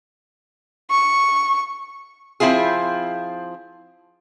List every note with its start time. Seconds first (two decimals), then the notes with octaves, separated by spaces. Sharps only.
0.90 C#6
2.40 F3 C4 E4 F4 G#4